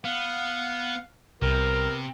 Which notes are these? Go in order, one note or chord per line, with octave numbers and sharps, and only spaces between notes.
B3 F5 F#5
C2 C3 B3 A#4